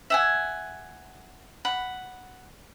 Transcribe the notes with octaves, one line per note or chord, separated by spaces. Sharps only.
E5 F#5 G#5
F#5 B5